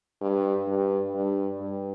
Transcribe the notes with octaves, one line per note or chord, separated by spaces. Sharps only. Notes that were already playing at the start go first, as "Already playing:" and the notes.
G2
G2
G2
G2